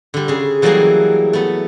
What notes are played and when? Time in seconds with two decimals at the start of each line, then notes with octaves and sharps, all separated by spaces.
0.14 D3 G3
0.28 C#3 G#4
0.62 E3 F#3 G3 A3 A#3 G#4
1.33 A3 B3